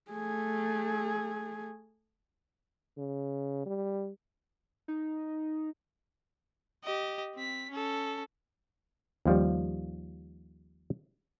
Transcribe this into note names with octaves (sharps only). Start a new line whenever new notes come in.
A3 G#4
C#3
G3
D#4
G4 D#5
C4 B6
C#4 A4
D#2 F3 G3